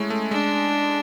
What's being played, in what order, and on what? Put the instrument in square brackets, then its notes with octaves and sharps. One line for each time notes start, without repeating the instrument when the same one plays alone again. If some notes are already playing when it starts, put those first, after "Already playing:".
Already playing: [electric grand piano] G#3 A3 C#4 E4
A3
[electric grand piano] G#3 [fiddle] D4